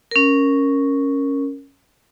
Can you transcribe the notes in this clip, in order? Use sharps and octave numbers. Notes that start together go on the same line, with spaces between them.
C#4 A#4